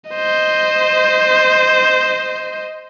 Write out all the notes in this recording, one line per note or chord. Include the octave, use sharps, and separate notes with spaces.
C5 D#5